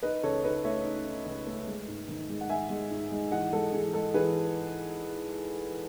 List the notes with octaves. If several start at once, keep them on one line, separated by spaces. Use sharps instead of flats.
D#4 B4 D#5
C#2 A4 C#5
D#4 B4 D#5
A3 C#5 E5
D#4
D#4
C#2
A3
G#3
G#2
D#3
G#3
F#5
D#3 E5 G#5
G#3
G#2
G#3
E3 D#5 F#5
G#3 A4
E3 G#4
G#3 A4
E3 G#4 B4